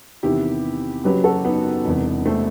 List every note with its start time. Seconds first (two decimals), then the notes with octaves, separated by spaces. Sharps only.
0.23 E2 C3 D#3 E4 G4
1.04 F#1 F#2 F#3 G4 B4
1.24 F#4 A4
1.45 B3 D#4
1.85 E1 E2 C3
2.26 A3 C4